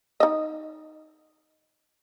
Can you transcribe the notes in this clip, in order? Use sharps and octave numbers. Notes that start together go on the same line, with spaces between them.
D#4 D#5